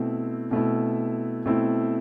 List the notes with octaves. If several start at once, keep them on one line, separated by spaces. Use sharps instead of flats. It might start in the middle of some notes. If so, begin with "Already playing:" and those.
Already playing: B2 A3 C4 E4
B2 A3 C4 E4
B2 A3 C4 E4